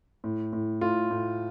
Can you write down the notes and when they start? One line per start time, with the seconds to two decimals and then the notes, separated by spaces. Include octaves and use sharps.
0.24 A2
0.53 A2
0.81 A2 F4
1.11 A2